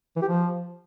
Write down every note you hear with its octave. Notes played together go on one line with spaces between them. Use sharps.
E3
G4
F3